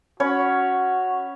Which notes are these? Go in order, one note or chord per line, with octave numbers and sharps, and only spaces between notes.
C#4 F#4 C#5 B5